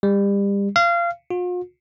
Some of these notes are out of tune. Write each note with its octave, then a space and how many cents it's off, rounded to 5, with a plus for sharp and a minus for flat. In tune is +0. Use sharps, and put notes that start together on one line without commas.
G3 +30
F5 -25
F4 +45